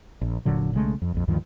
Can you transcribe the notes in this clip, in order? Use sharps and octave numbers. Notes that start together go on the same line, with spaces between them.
A#1
F1 A#2 D3 F#3
B1 C#3 G#3 A3
F2
A#1 F2
D2 G2 D#3 F3